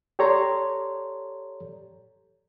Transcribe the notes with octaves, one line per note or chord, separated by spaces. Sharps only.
G4 A4 C#5 D5 A#5 C6